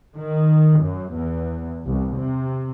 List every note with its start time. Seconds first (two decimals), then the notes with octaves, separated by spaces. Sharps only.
0.15 D#3
0.79 F#2
1.13 E2
1.85 C2
2.18 C3